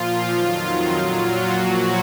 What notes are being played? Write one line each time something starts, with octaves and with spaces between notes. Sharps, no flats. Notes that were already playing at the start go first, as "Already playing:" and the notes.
Already playing: A#2 F3 F4
F2 D#3 F#3
D#4
A#2 F#3 F4
F#3 F#4
A#2 F3